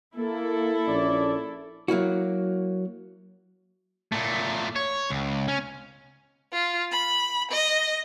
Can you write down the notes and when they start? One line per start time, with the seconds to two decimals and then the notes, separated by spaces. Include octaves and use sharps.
0.16 A#3 E4 A4
0.86 A#1 C#4 D5
1.88 F#3 A#3 E4 F#4
4.12 A#2 A3
4.76 C#5
5.10 C#2
5.48 C#4
6.53 F4
6.92 B5
7.52 D#5